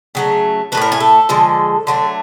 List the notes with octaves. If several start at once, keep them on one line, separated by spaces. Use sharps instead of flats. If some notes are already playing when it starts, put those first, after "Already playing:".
C#3 F#3 A3
F#3 A3 B4
A2 A#4
G#4
A4
D3 F3 G#3
D3 F#3 A3